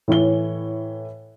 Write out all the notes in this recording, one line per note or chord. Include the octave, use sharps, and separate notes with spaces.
A2 E3 C#5 G7